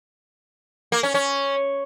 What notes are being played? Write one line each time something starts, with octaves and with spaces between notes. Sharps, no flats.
A#3
C#4
C#4